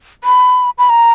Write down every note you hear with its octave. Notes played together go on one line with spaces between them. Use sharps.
B5
B5
A#5